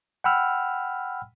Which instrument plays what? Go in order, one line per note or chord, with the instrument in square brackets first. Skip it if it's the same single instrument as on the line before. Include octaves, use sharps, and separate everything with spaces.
[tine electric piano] F#5 G5 B5 E6 F6